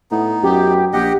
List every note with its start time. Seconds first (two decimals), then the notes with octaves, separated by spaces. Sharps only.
0.11 A2 B3 D#4
0.43 F#2 G4
0.93 A#1 G4 D#5 F#5